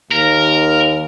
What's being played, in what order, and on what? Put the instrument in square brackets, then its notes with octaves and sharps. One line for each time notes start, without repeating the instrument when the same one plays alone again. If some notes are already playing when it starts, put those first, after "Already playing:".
[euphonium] D#2 [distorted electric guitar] A#4